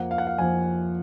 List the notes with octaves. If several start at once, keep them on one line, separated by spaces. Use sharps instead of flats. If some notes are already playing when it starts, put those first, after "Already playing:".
Already playing: F2 F3 A#3 F#5
F5
F#5
F5
F2 F3 A#3 G#5